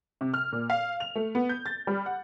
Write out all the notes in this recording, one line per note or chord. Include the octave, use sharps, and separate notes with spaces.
C3
F6
A#2
F5
F7
A3
B3
G6
A6
G3
F#5